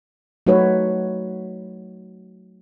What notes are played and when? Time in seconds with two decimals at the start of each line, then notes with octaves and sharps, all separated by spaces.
0.47 F#3 A3 D#4 F#4 B4 C#5